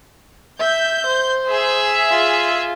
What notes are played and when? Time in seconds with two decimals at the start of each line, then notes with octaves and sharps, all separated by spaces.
0.60 E5 G6
1.06 C5
1.47 G#4 E5
2.11 F4